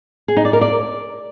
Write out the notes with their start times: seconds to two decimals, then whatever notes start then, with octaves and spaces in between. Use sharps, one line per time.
0.28 G#4
0.37 D#4
0.45 D5
0.53 A#4
0.61 D5